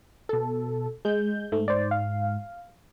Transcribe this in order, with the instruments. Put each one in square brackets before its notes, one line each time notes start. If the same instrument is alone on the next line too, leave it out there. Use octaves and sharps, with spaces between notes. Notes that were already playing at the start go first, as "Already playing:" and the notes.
[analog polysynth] B2 A4
[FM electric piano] G#3 [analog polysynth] G6
[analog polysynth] G#2 [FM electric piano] A3
[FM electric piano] C5 D5
F5